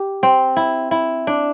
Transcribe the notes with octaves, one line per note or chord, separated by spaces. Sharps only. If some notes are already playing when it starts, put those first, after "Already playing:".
Already playing: G4
C4
E4
E4
D4